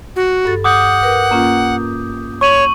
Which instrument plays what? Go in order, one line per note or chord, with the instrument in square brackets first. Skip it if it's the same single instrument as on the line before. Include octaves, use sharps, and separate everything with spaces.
[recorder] F#4
[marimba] G2 A4 A6
[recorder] F#5 [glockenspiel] D6 D#6 G6
[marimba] A#4 B4
A#3 C#4 F4
[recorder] C#5 [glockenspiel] C#6 D#7 F#7